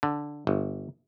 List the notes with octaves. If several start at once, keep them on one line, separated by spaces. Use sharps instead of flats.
D3
G1